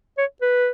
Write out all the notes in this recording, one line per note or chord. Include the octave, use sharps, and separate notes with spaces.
C#5
B4